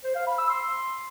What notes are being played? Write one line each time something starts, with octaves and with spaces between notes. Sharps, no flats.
C5
F5
B5
E6
C6